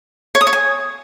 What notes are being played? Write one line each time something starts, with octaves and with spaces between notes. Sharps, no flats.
C#5
D#6
C#5
G#5